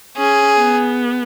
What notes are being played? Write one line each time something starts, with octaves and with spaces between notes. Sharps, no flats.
C#4 G#4
B3